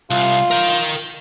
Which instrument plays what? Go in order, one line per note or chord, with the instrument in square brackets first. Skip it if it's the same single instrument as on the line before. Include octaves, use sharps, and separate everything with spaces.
[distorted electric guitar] C2 [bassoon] F4
[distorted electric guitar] A#4 G5